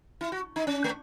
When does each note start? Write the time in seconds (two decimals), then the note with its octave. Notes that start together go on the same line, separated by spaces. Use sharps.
0.21 E4
0.32 F#4
0.56 D#4
0.67 C#4
0.84 A3